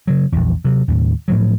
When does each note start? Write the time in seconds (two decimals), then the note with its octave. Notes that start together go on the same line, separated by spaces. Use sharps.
0.07 C#3 F#3
0.32 A#1 E2
0.65 C3 F#3
0.88 D#2 A2
1.28 A2 F3 F#3